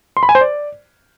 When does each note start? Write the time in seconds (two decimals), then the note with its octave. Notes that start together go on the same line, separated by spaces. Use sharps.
0.17 C6
0.23 B5
0.29 G#5
0.35 C5
0.41 D5